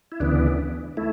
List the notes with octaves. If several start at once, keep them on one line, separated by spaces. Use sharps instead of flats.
E4
D2 C#3 E3 B3 D4
A3 E4